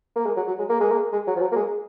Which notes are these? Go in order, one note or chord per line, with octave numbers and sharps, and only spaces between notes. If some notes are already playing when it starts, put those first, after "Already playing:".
A#3
G#3
F#3
F#3
G#3
A#3
G#3
A#3
G#3
F#3
F3
F#3
A#3
G#3